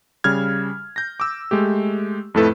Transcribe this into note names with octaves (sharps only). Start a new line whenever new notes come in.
C#3 G3 F6 G#6
G6 A#6
D6 E6
G#3 A3 G4
F2 A2 A3 E4 A4 B4